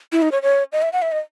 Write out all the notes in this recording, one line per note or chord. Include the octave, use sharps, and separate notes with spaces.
E4
D#4
C#5
C#5
D#5
E5
F#5
E5
D#5